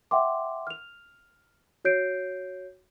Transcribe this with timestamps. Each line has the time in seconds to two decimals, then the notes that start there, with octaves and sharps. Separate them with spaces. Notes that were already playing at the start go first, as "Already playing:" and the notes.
0.11 E5 F#5 G5 C6 D6
0.67 F6 F7
1.85 F#4 C#5 G6 C7 D7